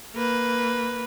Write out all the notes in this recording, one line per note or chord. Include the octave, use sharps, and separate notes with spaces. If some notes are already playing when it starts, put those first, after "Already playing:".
A#3 B4